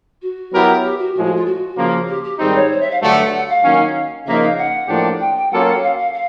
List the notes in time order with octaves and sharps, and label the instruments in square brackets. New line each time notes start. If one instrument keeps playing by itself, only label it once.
[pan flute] F#4
[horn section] F#3 B3 E4 G4 A#4
[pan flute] G4
F#4
[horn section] A2 F3 G#3 [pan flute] F#4
[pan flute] F#4
F4
F#4
[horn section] C#3 F3 A#3
[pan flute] G4
G4
[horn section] G#2 D#3 G3 C4 D#4 [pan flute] G#4
[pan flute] C#5
C5
E5
F5
[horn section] G2 D3 F#3 A3 [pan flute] F#5
[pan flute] F#5
F5
[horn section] D#3 F#3 A#3 C#4
[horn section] C#3 F3 A#3 D#4 [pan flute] E5
[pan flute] F5
F#5
[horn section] A2 F3 A#3 D4 G4
[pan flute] G5
G5
[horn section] F#3 A#3 C#4 F4 A4 [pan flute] F#5
[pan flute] F#5
F5
F5
F5